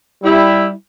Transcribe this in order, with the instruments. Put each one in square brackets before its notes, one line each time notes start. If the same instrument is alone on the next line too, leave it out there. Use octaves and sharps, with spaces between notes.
[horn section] G3 E4